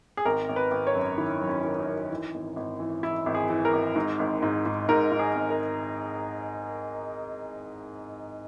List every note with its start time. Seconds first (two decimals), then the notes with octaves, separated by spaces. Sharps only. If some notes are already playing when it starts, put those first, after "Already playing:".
0.17 G#4
0.25 G#1 A#4
0.49 G#1
0.56 B4
0.71 G#1
0.87 C#5
0.95 F#2
1.18 D#3 E4
1.42 F#3
1.49 C#4
1.64 D#3
1.80 D#4
1.87 F#2
2.10 E3
2.34 G#1
2.56 G#1
2.80 E3
3.03 E3 E4
3.26 G#1
3.35 G#4
3.50 E3
3.65 A#4
3.73 G#1
3.95 G#2
4.19 G#1
4.42 G#2
4.66 G#2
4.89 G#2 A#4
5.12 G#2
5.19 G#4
5.35 G#1
5.50 A#4